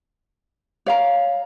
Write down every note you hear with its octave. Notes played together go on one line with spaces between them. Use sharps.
C#5 F5 A#5